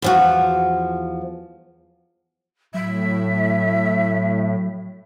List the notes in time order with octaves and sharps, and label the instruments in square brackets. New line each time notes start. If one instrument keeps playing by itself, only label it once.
[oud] E2 F3 F#4
[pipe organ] A2 [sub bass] F#3 [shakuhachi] E5